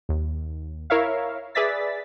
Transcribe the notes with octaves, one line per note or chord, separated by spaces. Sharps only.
D#2
E4 A#4 C#5 E5 F5
G#4 B4 D5 E5 A6 B6